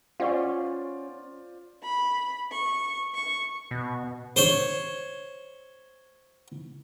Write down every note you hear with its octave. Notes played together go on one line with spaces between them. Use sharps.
C#4 F4 C5 D5 F5 F#5 C#6
B5
C#6
C#6
B2
C5 C#5